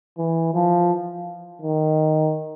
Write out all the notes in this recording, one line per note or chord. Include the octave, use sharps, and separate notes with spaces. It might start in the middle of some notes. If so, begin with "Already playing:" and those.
E3
F3
D#3